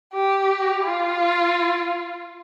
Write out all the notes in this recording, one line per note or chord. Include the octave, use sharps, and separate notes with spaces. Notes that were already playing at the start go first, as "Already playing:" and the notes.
G4
F4